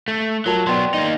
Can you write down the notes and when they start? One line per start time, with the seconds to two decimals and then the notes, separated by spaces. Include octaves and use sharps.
0.08 A3
0.46 F#3 F4 A#4 A5
0.67 F#3 B3 D5 G5 C6
0.94 A#3 D#4